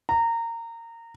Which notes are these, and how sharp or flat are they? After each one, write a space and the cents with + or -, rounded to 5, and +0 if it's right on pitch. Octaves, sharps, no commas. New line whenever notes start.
A#5 -20